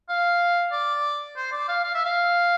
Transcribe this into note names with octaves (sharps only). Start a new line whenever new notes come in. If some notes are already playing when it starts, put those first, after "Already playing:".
F5
D5
C5
D5
F5
F5
E5
F5